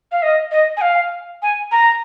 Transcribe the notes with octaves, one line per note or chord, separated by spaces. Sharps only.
F5
D#5
D#5
G#5
F5
G#5
A#5